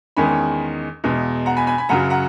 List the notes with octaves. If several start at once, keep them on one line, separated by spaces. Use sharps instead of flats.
E2 D#3 G#3 C#4 G#5 B5
E2 B2 G#3
F#5 A#5
G#5 B5
G#5 B5
G#5 B5
F#2 C#3 F#3 F#5 A#5
F#5 A#5